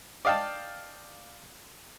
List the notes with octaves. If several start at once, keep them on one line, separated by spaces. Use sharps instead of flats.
D5 D#5 F5 G5 A5